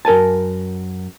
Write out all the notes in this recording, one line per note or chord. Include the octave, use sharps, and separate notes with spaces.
F#2 A#4 G#5 A5